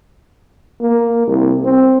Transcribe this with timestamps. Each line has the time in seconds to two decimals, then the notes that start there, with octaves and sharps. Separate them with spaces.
0.81 A#3
1.27 C2
1.64 C4